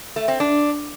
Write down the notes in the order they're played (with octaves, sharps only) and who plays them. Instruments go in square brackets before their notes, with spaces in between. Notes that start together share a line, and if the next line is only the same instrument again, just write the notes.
[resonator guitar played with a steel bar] A3
C4
D4